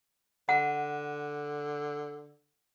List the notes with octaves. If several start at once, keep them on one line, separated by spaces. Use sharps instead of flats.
D3 F#5